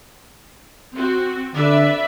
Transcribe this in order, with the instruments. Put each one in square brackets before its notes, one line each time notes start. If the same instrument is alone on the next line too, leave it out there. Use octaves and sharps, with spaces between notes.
[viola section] C4 F#4
[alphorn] D3 [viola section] B4 D5 E5